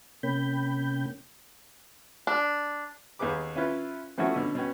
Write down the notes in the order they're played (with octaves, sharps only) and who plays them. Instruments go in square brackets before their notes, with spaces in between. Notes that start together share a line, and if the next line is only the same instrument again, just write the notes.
[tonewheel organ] C3 A#3 C#4 G5 B5 G6
[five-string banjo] D4
[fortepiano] D#2 B3 G#4 B4 D6
C#4 E4 F4 B4
E3 F3 A3 C#4 E4 F#4
B2 D3 C#4
B2 B3 C#4 G5